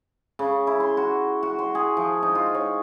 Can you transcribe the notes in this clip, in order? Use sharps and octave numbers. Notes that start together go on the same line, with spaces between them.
C#3
E4
C6
F#4
F#4
C6
G#4
F3
D#4
F4
C#5